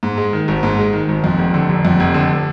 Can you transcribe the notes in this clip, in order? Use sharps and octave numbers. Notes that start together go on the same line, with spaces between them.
G#2
G#3
D#3
G#1
G#2
G#3
D#3
G#1
F2
F1
D3
F1
F2
F1
D3